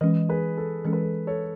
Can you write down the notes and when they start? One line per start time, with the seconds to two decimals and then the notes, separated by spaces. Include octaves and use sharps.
0.01 E3 G#3 C#4 B4 D#5
0.29 G#4 B4
0.58 A4
0.85 E3 G#3 C#4 A4
0.93 B4
1.02 A4
1.27 A4 C#5